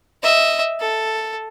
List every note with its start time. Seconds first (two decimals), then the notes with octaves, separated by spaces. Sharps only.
0.23 D#5 E5
0.80 A4